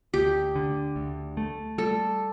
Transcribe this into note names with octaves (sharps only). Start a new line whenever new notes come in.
D2 G4
D3
D2
A3
G3 A4